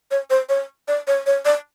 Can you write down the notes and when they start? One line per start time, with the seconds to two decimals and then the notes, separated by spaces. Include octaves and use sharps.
0.11 C#5
0.30 C5
0.49 C#5
0.88 D5
1.07 C#5
1.26 C#5
1.45 D5